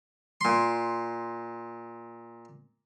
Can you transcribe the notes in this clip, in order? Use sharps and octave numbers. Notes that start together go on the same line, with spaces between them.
A#2 C6